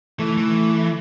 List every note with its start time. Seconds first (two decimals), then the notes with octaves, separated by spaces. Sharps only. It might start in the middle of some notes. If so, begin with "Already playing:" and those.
0.19 E3 A3
0.37 E3